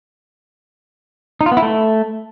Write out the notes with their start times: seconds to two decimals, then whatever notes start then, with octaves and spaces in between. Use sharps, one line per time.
1.41 D#4
1.46 F4
1.52 B3
1.57 E4
1.62 A3